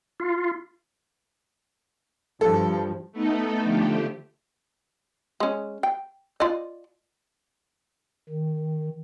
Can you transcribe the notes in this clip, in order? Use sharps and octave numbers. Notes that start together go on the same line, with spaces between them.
F4
G2 F3 A4
A3 B3 D#4 A4
D3 F3 A3 G4
G#3 C#4
G5
F4 D5 D#5
D#3